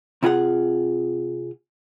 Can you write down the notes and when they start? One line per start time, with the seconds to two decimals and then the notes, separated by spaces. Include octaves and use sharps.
0.23 C3 E4 F4 G#4 F#5